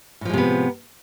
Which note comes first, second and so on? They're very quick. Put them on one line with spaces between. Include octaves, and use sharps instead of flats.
A2 F3 G#3 C3 B3